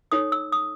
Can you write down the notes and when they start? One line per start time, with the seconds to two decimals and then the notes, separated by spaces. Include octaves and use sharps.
0.12 D#4 A4 C#5 D#6
0.32 E6
0.52 D#6